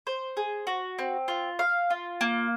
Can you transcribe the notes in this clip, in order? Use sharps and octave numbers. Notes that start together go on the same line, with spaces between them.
C5
G#4
F#4
C4
F4
F5
F4
A#3